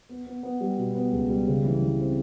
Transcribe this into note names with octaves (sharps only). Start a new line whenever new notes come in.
B3
B3
B3
G3
B2
B3
C#2
G3
C#3
E3
E3
C4